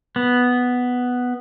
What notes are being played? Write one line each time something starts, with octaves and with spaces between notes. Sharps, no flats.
B3